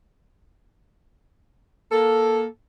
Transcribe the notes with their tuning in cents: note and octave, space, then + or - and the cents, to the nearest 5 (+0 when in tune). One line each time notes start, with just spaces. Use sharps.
A#3 +10 A4 +0